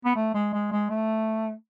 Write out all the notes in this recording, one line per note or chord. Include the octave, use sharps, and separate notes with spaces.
B3
A3
G#3
G#3
G#3
A3